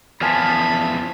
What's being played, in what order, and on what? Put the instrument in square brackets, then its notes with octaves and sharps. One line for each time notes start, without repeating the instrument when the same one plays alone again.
[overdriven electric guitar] E2 F3 [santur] F5 G#5 A5 [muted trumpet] B5